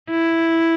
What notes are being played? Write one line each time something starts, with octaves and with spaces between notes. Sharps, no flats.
E4